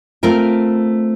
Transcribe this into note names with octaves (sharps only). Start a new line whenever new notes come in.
A3 C4 F4 A#4